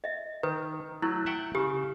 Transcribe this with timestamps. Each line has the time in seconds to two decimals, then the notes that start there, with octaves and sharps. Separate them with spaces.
0.04 D#5 E5
0.43 D#3 B4
1.02 F#3 A3 E4
1.26 E5 F#5 G5
1.55 C#3 G4